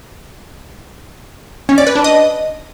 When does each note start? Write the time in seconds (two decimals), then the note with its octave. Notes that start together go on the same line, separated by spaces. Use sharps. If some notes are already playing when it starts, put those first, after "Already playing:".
1.69 C#4
1.78 D5
1.87 B4
1.95 D4
2.04 D#5